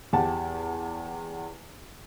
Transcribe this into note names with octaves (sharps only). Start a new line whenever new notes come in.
E2 G4 F#5 A5